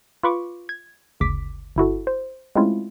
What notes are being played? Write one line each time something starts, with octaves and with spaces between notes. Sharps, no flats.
F4 B4 B5 C#6 D6
G#6
G1 D2 C#3 D6 B6
G1 E4 F#4 A4
C5
G#3 A3 C4 C#4 E4 F4